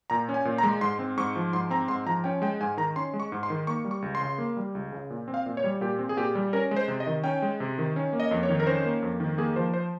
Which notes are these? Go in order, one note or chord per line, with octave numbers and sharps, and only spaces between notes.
A#2 A#5
C#4
G#5
A#2
A#5
G#3
G#2 C6
C4
G#2 C#6
F3
G#2 C6
C4 A#5
G#2 C6
F3 A#5
C#4 G5
G#3 G5
G#2 G#5
D#3 A#5
C#4 C6
G#3
C#6
G#2
C6
D#3
A#3 C#6
G3
C#6
C#2
C6
C#3
A#3
G3
C#2
C#3
A#2
C4
F5
A#2
C#5
G3
A#2 G4
C4
G#4
A#2 G4
G3
C#4 A#4
G#3
C5
C3
D#5
D#3
C#4 G5
G#3
C3
D#3
C#4
A#3
D#5
F2
C#5
D#3
A#4
C#4 C5
A#3
F2
D#3
A#3 G#4
F3 C5
C5